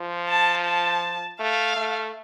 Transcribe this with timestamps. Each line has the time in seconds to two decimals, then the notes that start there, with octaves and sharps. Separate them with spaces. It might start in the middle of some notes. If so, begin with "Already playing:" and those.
Already playing: F3
0.29 A5
0.65 A5
1.40 A3 F5
1.76 A3